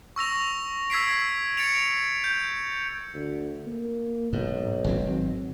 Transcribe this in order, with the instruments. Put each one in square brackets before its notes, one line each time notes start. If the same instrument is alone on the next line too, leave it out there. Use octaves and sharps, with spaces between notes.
[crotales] C#6 E6 A#6 F7
E6 G#6 B6 C7 D7
A6 C#7 D7 F7
G6
[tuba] D2
A#3
[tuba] B1 [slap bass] G#2
[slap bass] G#1 F#3 C4